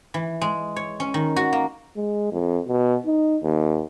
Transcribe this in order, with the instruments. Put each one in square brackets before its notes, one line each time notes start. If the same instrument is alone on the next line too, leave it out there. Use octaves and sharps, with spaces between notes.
[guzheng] E3
G#3
C#5
C#4
D#3
F#4
A#3
[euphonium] G#3
F2
B2
D#4
D#2